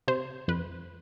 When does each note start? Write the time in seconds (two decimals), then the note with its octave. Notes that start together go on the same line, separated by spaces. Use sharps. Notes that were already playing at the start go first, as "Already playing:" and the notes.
0.08 C3 C5
0.48 F2 B4